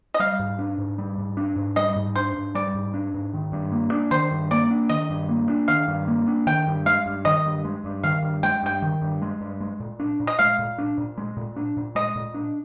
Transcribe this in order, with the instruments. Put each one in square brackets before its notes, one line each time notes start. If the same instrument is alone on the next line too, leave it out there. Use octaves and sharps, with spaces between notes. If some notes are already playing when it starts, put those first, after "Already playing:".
[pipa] D#5
[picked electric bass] G3 [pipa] F5
[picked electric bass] G#2
D4
G#2
G3
G#2
D4
G#2
[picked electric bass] G3 [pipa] D#5
[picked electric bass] G#2
[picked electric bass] D4 [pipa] C5
[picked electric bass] G#2
[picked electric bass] G3 [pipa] D5
[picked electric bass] G#2
D4
G#2
D#3
G2
A#3
D4
[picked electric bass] D#3 [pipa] C5
[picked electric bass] G2
[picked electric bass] A#3 [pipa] D5
[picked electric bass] D4
[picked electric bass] D#3 [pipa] D#5
[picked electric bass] G2
A#3
D4
[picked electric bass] D#3 [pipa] F5
[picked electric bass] G2
A#3
D4
[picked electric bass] D#3 [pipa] G5
[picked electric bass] G2
[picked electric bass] G#3 [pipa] F5
[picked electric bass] G2
[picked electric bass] D#3 [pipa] D#5
[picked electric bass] G2
G#3
G2
[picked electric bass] D#3 [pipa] F5
[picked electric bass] G2
[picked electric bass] G#3 [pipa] G5
[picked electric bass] G2 [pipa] G5
[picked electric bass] D#3
G2
G#3
G2
G#3
A#2
D4
A#2
[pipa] D#5
[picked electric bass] G#3 [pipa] F5
[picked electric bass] A#2
D4
A#2
G#3
A#2
D4
A#2
[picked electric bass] G#3 [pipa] D#5
[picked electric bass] A#2
D4